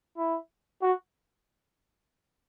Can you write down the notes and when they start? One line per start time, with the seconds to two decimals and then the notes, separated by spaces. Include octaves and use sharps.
0.18 E4
0.82 F#4